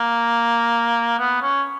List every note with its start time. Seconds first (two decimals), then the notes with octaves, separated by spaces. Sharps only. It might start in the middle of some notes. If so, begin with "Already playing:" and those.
Already playing: A#3
1.19 B3
1.42 C#4